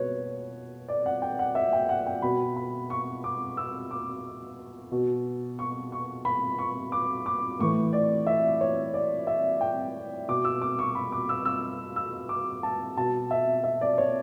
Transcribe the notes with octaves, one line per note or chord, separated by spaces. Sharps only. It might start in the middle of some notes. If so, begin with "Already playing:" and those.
Already playing: B2 B4 C#5
D5
F#5
G5
F#5
E5
G5
F#5
G5
B2 B5
B5
C#6
D6
E6
D6
B2
C#6
C#6
B5
C#6
D6
D6
A2 E3 C#6
D5
E5
C#5
D5
E5
G5
B2 D6
E6
D6
C#6
B5
D6
E6
E6
E6
D6
A5
B2 A5
E5
E5
D5
C#5